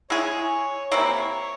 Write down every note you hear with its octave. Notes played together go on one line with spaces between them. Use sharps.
G#3 E4 G#4 C#5
C3 E3 A#3 E4 C#5
C#5